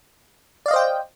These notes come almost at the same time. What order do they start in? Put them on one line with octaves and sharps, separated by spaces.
D5 F5 D#5 C5 G5